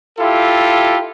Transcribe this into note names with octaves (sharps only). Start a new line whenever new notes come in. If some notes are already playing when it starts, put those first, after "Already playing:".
E4 F4 G4 A4